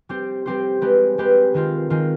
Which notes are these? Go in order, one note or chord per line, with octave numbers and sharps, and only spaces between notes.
G3 C4 G4 C5
G3 C4 G4 C5
G#3 C4 G4 B4
G#3 C4 G4 B4
D#3 G#3 C4 F4
D#3 G#3 C4 F4